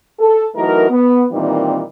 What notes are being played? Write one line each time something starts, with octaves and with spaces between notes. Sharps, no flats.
A4
E3 F#3 A3 D#4 A#4
B3
A#2 D#3 E3 G3 C4 D#4